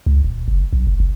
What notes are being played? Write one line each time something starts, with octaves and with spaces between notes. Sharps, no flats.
C#2
D#1
F#1
B1
F1
F1